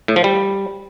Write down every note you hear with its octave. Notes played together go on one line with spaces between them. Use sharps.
A2
F3
G3